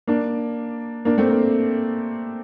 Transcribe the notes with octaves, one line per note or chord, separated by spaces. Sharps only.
A#3 D4
A#3 D4
A3 C4
A#3